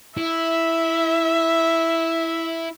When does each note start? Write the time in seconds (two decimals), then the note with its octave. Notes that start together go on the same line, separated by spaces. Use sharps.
0.17 E4 E5